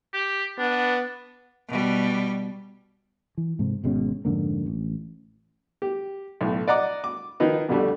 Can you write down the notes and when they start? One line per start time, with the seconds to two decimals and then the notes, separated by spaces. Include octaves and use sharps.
0.13 G4
0.58 B3 D4
1.69 B2 G3
3.37 E3
3.59 G#2 C3
3.84 G#1 B2 G#3 C#4
4.25 F2 G#2 D3 A#3
4.66 A1
5.82 G4
6.41 B1 A2
6.68 D5 D#5 F#5 A#5 D6
7.04 D6
7.40 D#3 F3 D#4 B4
7.69 F2 B2 D3 G3 A3